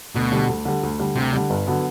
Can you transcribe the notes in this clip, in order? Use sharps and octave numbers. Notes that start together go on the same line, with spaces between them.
D2 B2
D3 G3
D2
D3 G3
D2
D3 G3
D2 C3
D3 G3
G1
D3 F#3 B3